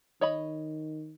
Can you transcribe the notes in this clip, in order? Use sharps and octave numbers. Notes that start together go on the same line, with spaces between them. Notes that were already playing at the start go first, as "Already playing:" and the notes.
D#3 C#5 D#5 B5